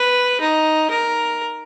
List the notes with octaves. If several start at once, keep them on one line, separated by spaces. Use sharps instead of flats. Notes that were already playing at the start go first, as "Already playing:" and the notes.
Already playing: B4
D#4
A#4